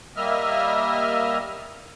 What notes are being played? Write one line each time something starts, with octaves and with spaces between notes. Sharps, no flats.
G3 A#3 D#5 E5 F6